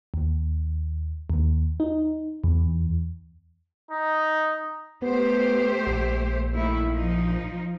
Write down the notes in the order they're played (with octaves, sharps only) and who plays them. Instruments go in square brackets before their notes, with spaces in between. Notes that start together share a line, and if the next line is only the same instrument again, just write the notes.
[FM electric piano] D#2
D#2
D#4
E2
[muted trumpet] D#4
[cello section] A3 G4 C5 [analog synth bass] B3
[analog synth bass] A#1
[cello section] D#3 A3 E4
F3 D#4